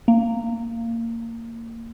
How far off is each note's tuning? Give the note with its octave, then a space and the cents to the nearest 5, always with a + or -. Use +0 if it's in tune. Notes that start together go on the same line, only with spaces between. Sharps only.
A#3 -20